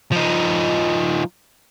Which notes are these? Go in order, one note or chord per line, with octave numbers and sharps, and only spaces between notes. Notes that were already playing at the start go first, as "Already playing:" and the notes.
F3 D#4